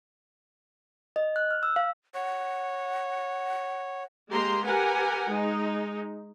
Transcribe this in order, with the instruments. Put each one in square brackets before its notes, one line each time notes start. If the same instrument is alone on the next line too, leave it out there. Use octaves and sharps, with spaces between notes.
[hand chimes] D#5
F#6
F6
E6
F5
[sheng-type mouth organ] C#5 [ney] F#5
[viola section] G#3 A#3 G4 A#5 C6
G4 A#4 B4 F#5 G#5
G#3 D#4